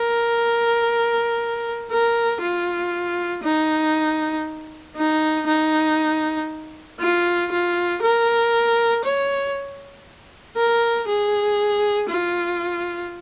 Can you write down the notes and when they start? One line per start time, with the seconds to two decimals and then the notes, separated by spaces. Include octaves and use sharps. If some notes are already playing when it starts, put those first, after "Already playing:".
Already playing: A#4
1.91 A#4
2.41 F4
3.44 D#4
4.97 D#4
5.47 D#4
7.00 F4
7.51 F4
8.02 A#4
9.04 C#5
10.57 A#4
11.08 G#4
12.09 F4